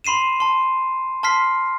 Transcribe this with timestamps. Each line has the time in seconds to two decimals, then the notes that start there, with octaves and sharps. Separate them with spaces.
0.04 B5 C6 C7 D#7 E7
0.40 A5 C6
1.23 A5 C6 F6 B6 C7